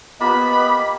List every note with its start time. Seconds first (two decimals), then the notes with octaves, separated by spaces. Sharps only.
0.20 A#3 B3 F4 G4 D#5 B5